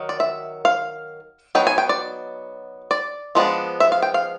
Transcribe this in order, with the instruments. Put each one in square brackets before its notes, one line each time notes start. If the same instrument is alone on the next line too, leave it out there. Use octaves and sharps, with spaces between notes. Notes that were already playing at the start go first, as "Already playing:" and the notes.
Already playing: [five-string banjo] D#3 F#3
D5
E5
F5
F#3 B3 D#4 G5
G#5
G5
D5
D5
F3 G#3 B3 D4
E5
F5
G5
F5